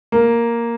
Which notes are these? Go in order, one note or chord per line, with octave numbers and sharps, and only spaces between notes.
A#3